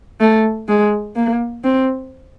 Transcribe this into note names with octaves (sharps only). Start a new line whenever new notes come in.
A3
G#3
A#3
C4